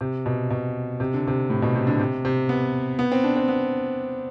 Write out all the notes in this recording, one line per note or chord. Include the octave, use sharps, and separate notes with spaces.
C3
B2
B2
C3
D3
C3
A2
B2
C3
D3
C3
C3
B3
B3
C4
D4
C4
B3